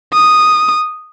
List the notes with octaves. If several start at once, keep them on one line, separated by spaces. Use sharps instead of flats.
D#6